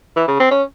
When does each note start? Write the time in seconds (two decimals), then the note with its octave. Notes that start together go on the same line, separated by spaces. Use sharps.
0.16 E3
0.28 C#3
0.40 C4
0.51 C#4